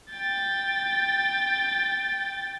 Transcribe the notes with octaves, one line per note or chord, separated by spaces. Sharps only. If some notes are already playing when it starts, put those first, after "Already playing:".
G5 A6